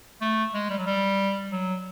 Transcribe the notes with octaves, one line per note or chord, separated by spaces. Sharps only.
A3
G#3
G3
F#3
G3
F#3